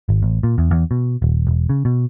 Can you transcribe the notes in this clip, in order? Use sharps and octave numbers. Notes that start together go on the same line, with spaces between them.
G#1
A1
A#2
E2
E2
B2
D#1
E1
C#3
B2